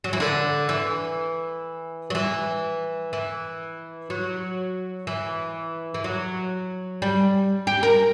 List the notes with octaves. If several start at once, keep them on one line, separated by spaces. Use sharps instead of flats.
F#3
E3
D3
E3
F#3
E3
E3
F#3
E3
E3
F#3
G3
G4
A#4